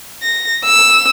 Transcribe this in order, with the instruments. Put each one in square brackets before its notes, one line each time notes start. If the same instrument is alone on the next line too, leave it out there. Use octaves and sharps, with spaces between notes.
[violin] A#6
E6